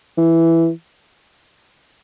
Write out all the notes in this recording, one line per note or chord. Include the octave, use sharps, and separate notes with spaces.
E3